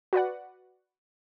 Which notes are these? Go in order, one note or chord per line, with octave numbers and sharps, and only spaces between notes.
F#4 B4 D5 F#5